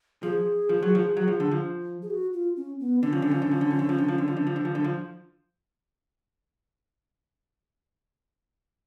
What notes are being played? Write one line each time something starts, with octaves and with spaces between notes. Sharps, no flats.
F3 G#4
F3
F#3
F3
F#3
F3
D3
F3
G#4
F#4
F4
C#4
B3
D3 C#4
F3
D3
F3
D3
F3
D3
F3
D3
F3
D3
F3
D3
F3
D3
F3
D3
F3
D3
F3